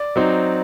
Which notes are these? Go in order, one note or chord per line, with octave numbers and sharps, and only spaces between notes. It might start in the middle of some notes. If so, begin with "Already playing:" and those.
Already playing: D5
F#3 C4 D#4